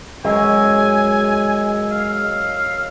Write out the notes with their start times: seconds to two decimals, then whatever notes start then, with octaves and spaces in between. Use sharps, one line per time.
0.25 F#2 G#3 D#5 G#5 E6
1.92 F5